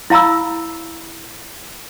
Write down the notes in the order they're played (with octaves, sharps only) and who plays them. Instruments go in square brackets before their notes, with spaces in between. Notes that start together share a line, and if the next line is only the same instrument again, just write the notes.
[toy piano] E4 F5 A#5 B5 E6